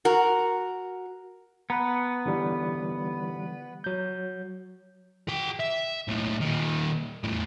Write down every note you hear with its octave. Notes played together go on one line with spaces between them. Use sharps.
F#4 A#4
B3 B4 A#5
D3 E3 G3
F#3 G6
G#4 G5
E5
B1 A2
A#2 D#3
E2 A2